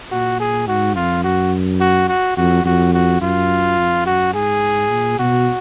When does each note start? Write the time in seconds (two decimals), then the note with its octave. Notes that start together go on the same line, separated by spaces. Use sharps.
0.11 A#2 F#4
0.40 G#4
0.67 G#2 F#4
0.96 F2 F4
1.24 F#2 F#4
1.81 F#4
2.08 F#4
2.37 F2 F#4
2.65 F2 F#4
2.93 F#4
3.21 F#2 F4
3.78 F2
4.06 F#2 F#4
4.34 G#2 G#4
4.90 A#2
5.19 B2 F#4